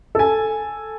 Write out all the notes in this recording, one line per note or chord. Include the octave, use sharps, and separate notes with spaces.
A4 G#5